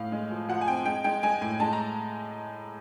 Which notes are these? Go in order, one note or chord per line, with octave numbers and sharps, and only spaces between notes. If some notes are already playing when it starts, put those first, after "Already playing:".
Already playing: A2 F5
G#3
F3
F3 F#5
G#5
C4 G5
G#3 G5
G#3 G5
G#3 G#5
A2 G#5
G#3 A5
A#5